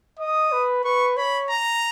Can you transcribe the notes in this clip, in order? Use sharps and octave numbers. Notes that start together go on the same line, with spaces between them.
D#5 D#6
B4
B4 C#6
C#5 B5
A#5